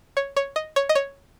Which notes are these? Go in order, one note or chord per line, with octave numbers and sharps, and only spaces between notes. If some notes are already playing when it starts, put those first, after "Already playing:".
C#5
C#5
D#5
C#5
D#5
C#5